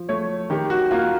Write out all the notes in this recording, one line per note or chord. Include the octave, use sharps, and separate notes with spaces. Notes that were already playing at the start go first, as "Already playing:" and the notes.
Already playing: F3
A3 C#5
D#3 G4
F#4
A#3 F4